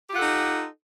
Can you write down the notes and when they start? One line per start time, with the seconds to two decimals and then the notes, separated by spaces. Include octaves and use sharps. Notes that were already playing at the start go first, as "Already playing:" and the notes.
0.10 G4
0.12 F4
0.15 F#5
0.17 A4
0.20 D#4